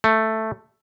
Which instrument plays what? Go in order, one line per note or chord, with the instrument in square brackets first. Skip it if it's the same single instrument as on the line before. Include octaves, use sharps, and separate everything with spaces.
[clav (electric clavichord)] A3